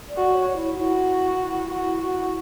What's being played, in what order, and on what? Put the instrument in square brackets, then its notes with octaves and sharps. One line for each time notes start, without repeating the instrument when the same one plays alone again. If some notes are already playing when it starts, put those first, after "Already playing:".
[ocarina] D5
[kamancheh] F#4
[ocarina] C#5
E4
[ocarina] E4 [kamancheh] F#4
[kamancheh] F#4
F#4